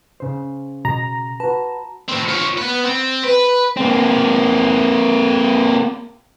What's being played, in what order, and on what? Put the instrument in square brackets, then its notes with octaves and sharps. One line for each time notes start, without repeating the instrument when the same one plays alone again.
[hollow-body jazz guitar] C#3 C5
[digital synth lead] B2 [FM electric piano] A#5
[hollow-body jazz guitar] F#4 B4 [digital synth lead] A5
[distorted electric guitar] A2 C4
F4 C#5
B3 B4
C4
B4
[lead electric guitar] A#3 C4